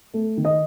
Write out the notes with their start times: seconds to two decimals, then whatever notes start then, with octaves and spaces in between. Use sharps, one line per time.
0.14 A3
0.37 D#3
0.45 D#5